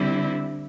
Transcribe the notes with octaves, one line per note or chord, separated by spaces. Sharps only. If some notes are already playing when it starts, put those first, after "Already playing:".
Already playing: D3 G3 C4 E4